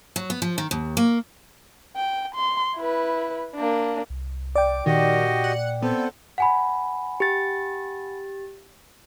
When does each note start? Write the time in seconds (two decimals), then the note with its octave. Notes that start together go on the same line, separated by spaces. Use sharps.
0.16 F#3
0.30 B3
0.42 F3
0.58 D#3
0.71 D#2
0.97 A#3
1.96 G5
2.35 C6
2.76 E4 B4
3.55 A#3 D4
4.10 C2
4.56 D5 G5 D6
4.86 A#2 D#3 F#4 G4 D#5
5.44 F#5
5.82 B3 C4 A4
6.38 F#5 G#5 B5
7.20 G4 A6